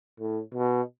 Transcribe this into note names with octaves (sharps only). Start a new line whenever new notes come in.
A2
B2